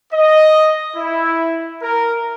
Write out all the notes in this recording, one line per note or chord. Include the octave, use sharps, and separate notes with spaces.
D#5
E4
A#4